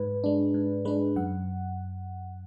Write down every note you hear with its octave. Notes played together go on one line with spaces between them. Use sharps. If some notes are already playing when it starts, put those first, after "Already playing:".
Already playing: G#2 B4
G#3 D4
G#2
G#3 D4 B4
F#2 F#5